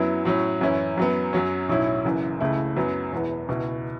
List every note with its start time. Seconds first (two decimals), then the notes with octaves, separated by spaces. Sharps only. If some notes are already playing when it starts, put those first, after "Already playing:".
Already playing: F#2 F#3 B3 E4
0.25 A2 F#3 C#4
0.61 F#2 E3 C#4 E4
0.97 F#2 F#3 B3
1.33 F#2 F#3 C#4
1.69 B1 A2 F#3 C#4 E4
2.04 F#1 F#2 E3
2.41 C#2 C#3 A3 E4
2.76 F#2 F#3 B3
3.12 E1 E2 E3 B3
3.48 C#2 B2 B3 E4